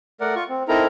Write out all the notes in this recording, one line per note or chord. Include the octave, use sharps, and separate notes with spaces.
A3 A#4 D5 F#5
F4 C#6
C4
C4 D#4 E4 A4 A#4 A#5